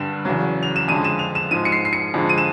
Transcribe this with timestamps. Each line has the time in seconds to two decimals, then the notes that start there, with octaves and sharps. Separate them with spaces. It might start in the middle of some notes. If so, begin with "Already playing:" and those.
Already playing: G2 D3 G3 E7
0.25 E2 C#3 F#3
0.63 F7
0.76 E7
0.88 F2 D3 F3 G#3 D#7
1.04 E7
1.19 F7
1.35 E7
1.51 G#2 F3 G#3 D#7
1.65 C#7
1.72 C7
1.85 C7
1.93 C#7
2.14 F2 D3 F3 G#3
2.29 D#7
2.38 E7